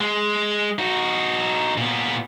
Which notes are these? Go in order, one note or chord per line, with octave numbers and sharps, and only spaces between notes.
G#3
D#4 F#4
A#2 B3